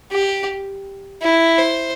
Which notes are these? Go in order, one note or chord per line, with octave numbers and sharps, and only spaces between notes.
G4
E4
C5